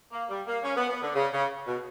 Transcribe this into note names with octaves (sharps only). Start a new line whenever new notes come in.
A#3
G3
A#3
C#4
B3
B3
D3
C#3
C#3
B2